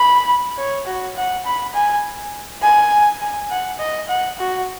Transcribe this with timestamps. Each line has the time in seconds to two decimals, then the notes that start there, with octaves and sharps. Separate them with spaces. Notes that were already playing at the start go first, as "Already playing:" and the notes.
Already playing: B5
0.58 C#5
0.86 F#4
1.16 F#5
1.46 B5
1.74 G#5
2.63 G#5
3.21 G#5
3.51 F#5
3.79 D#5
4.08 F#5
4.39 F#4